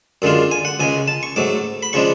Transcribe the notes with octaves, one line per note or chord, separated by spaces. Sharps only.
F#2 D3 G#3 D4 F4
G#5
F#5
C#2 C#3 G#3 G#5
A5
C#6
G#2 F#3 A3 D6
B5
C#3 F3 G#3 D4 C#6